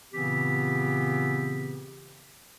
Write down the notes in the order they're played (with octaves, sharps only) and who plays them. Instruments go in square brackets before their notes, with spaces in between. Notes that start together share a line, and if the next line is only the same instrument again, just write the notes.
[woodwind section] A#2 C#3 E3 B3 C4 G4